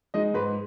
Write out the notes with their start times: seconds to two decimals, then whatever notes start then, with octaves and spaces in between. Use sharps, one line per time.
0.14 G#3 D#4 D#5
0.34 G#2 B4